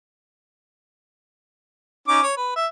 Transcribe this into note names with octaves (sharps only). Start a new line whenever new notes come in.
C#4 D#4 D6
C#5
B4
E5